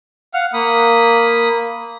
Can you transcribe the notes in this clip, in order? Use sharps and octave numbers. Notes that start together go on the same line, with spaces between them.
F5 F#5 F6
A#3 B5 D#6